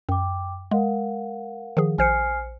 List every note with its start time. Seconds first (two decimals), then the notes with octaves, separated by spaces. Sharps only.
0.09 F#2 G5 D6
0.71 G#3 A#4 F5 F#5
1.77 D#3 F3 G#4
1.98 A#1 C5 G#5 F6 C7 C#7